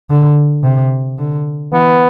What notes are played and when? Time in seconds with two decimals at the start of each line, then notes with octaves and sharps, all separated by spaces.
0.10 D3
0.64 C3
1.19 D3
1.73 E3 B3